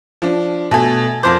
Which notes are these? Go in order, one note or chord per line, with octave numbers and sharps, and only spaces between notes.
F3 D4
B2 A3 A4 G#5
F2 A#3 D4 C5 D6